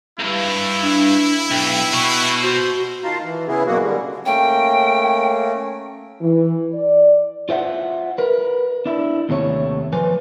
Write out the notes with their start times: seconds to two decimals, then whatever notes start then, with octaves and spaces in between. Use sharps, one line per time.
0.19 C#2 G2 E4
0.81 D4
1.51 B1 G5
1.93 B2 C#6
2.43 F#4 C5
3.04 D#3 F4 F5 A5 A#5 C6
3.24 E3
3.48 C#3 B3 E4 G#4
3.66 F#2 B2 A#3 F#4
3.82 D3 G3
4.26 A3 A#3 C#4 G5
6.21 E3
6.73 D5
7.49 F4 C5 E5 F#5
8.18 A#4 B4
8.86 D4 E4
9.29 D#2 C3 A3 C#5
9.93 F3 B4 C5 G#5